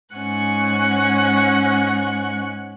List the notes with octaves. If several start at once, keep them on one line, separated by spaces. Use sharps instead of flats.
G#2 C#4 F#5 C#6 F#6